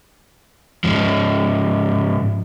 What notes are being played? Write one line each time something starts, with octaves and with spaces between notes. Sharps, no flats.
G#2 F3